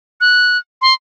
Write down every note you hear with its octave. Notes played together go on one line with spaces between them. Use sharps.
F#6
C6